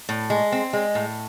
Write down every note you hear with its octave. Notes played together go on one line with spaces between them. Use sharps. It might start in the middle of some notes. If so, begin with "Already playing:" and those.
A2
G#3
C4
G#3
A2